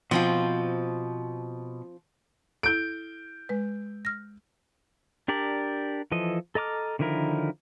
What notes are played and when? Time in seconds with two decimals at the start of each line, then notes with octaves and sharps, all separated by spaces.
0.11 B2 F3 C4 F4
2.63 E4 A4 G6 D7
3.49 G#3 B4
4.05 F6 A#6
5.28 D4 G4 A#4 D5
6.12 E3 F3 A4 D#5
6.55 A4 D#5 A#5 D6 F6
6.99 D3 D#3 F3 E4 A#4